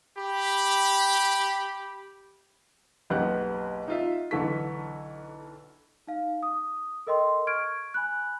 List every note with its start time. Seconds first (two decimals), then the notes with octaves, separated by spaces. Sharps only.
0.18 G4 B5
3.10 F#1 B1 B3 G4 F#6
3.88 D#4 F4 E5
4.31 B1 D3 E3 A4 C#6 B6
6.07 D#4 F5
6.43 D#6
7.07 A4 A#4 D#5 G5 C6
7.47 C#6 F6 G#6 D7
7.94 G#5 B5 F#6